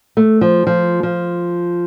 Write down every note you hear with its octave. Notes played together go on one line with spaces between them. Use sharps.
A3
F3
F3
F3